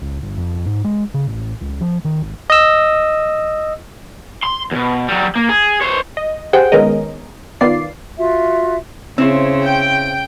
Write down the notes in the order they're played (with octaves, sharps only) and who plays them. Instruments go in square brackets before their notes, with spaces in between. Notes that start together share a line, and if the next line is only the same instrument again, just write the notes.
[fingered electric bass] C#2
G1
F2
G#2
G#3
C#3
A1
C#2
F3
D#3
G#1
[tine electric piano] D#5 E6
[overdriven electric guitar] C6
D#2 B2
F#3 G3
A#3
G#4
C5 C#5
[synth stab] D#5
G4 G#4 C5 F#5 G5
D#3 G#3 B3 C#4 A#4 D#5
D#3 B3 F4 D5 C7
[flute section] F4 F#4 E5
[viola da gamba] C#3 [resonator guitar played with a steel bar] C4 E4 C5
[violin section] G5